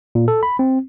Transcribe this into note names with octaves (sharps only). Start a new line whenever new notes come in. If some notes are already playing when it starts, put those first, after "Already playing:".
A#2
A4
B5
C4